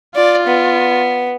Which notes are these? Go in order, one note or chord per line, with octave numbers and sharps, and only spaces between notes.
F4 D5
B3